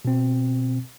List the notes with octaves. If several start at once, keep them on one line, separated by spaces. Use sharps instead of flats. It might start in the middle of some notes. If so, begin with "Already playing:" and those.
B2 C4